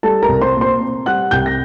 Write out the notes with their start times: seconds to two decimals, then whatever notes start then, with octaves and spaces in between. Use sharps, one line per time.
0.03 G3 A4 A5
0.22 A#4 A#5
0.28 C2
0.41 C5 C6
0.55 A#2
0.61 C5 C6
0.80 C4
1.06 G3 F#5 F#6
1.31 C2 G5 G6
1.46 A#6